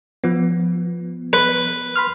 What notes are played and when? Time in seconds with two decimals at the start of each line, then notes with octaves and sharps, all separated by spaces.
0.24 F3 B3
1.33 B4
1.96 B5 C6 F6